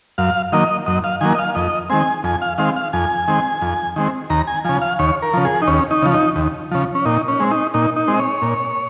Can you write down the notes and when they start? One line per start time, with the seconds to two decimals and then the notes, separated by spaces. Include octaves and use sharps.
0.18 F#2 F5
0.52 D#3 F#3 A#3 D#5
0.86 F#2 D#5
1.04 F5
1.21 D#3 F#3 A#3 G#5
1.35 D#5
1.39 F5
1.55 F2 D#5
1.90 D#3 G#3 C4 G#5
2.24 F2 G#5
2.42 F5
2.58 D#3 G#3 C4 F5
2.76 F5
2.93 F2 G#5
3.28 D#3 G#3 C4
3.62 F2
3.96 D#3 G#3 C4
4.30 D#2 A#5
4.47 G#5
4.65 C#3 F3 G#5
4.82 F5
4.99 D#2 C#5
5.22 A#4
5.34 C#3 F3
5.45 G#4
5.62 D#4
5.67 D#2 C#4
5.91 D#4
6.02 C#3 F3
6.13 D#4
6.36 D#2
6.71 C#3 F3
6.95 C#4
7.05 A#2 D#4
7.28 C#4
7.40 G#3 C4
7.51 D#4
7.74 A#2 D#4
7.96 D#4
8.08 G#3 C4
8.14 D#5
8.19 C#5
8.42 A#2